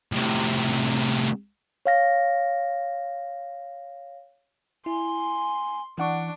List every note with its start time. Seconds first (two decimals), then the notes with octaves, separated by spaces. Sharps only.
0.12 A2 C3
1.86 C#5 F5 A#6
4.86 E4 G#5 C6
5.98 E3 D4 F#5 C#6